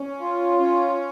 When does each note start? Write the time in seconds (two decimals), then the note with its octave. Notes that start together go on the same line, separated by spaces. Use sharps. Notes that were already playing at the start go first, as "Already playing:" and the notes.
Already playing: C#4
0.20 F4
0.59 C#4